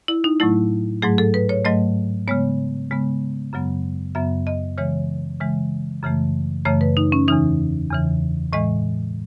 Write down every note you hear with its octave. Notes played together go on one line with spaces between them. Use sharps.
E4
D#4
A2 F#3 A3 E4
G#2 F#3 A3 G#4
A4
B4
C#5
G#2 F#3 A3 D#5
C#3 G#3 B3 C#5
C#3 G#3 B3
F#2 C#3 F#3 B3
F#2 C#3 F#3 B3 E5
D#5
C#3 E3 G#3 C#5
C#3 E3 G#3
F#2 C#3 E3 A3
F#2 C#3 E3 A3 C#5
B4
D#4
C#4
E2 C#3 E3 D#4
E2 C#3 E3
A2 E3 G#3 D#5